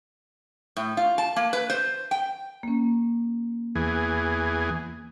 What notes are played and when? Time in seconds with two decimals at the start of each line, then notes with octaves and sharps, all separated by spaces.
0.77 A2
0.97 F4
1.18 A5
1.36 A#3
1.53 B4
1.70 C5
2.11 G5
2.63 A#3 C#4
3.75 E2 E3 G#4